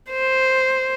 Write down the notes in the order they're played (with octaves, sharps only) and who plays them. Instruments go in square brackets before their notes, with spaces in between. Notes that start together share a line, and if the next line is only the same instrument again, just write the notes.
[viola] C5